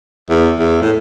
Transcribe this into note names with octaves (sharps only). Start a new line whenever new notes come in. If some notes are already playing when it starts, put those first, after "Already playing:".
E2
E2
A2